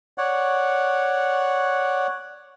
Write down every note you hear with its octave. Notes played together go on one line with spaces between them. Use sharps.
C#5 D5 F#5